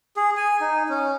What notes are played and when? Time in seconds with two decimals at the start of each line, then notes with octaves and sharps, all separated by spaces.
0.17 G#4
0.37 G#5
0.61 D#4
0.89 C#4